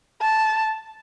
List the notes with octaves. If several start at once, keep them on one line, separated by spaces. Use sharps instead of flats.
A5